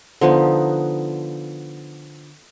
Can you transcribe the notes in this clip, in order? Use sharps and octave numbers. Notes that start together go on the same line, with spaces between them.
D3 F3 B3 D#4